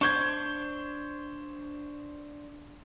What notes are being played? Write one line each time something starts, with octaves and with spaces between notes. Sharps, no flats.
D4 C5 C#6 G6 G#6